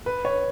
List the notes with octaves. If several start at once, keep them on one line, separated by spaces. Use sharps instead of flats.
B4
C#5